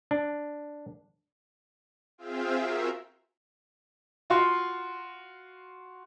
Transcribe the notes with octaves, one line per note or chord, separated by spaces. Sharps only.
D4
C4 F4 G#4 E5 F5 G5
F#4 A#4 E5
F4 F#4 C6